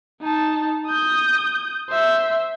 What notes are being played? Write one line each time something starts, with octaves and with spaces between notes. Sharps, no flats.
D#4 A5
D#6 G6
C5 E5